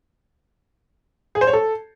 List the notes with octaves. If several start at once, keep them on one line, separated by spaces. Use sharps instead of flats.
G#4
C5
C#5
A4